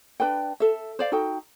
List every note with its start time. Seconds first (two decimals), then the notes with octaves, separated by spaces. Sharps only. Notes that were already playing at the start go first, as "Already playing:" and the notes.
0.20 D4 B4 D5 G5
0.60 A4 E5
0.99 C5 D5 F5
1.12 D#4 F#4 A4 G5